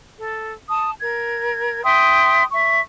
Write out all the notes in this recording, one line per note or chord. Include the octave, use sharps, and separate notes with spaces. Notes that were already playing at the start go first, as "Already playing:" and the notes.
A4
A5 D#6
A#4 G#6
E5 G5 C6 D#6
E5 C#6